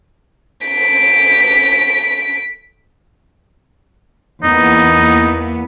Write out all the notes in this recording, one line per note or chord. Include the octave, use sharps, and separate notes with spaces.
B6 D7
E2 A#3 B3 D#4